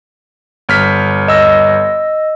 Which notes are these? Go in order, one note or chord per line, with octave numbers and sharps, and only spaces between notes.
G1 F6 B6
D#5 E6